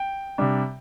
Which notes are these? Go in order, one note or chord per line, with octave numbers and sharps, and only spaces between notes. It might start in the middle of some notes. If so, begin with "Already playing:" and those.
Already playing: G5
C3 G3 D4